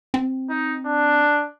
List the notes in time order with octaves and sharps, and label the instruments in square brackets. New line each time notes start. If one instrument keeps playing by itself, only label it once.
[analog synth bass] C4
[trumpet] D#4
D4